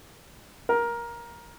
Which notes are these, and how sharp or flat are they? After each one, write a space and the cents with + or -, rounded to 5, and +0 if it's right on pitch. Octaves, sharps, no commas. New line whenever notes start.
A#4 +15